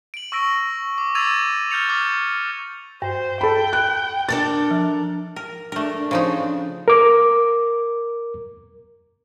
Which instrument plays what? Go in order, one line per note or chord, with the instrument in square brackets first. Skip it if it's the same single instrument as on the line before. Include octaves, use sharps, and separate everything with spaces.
[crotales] D7 F#7
C#6 E6 A#6 D7
D6
D6 E6 G#6 A6 D#7 F7
F6 G6 A6 C#7 F7
D6 F6
[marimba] G2 [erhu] C5
[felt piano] A4 B5 [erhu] G5
[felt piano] F#6
[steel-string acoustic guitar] D4 A4 A#4 [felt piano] A6
[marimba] F3
[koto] A#4
[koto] A3 A#4 [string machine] D4
[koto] C#3 F3 D#4
[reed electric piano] A#4 D6